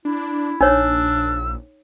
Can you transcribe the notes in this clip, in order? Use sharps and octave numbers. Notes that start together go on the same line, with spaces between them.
D4 E4
A#1 D4 D#4 C#5 E6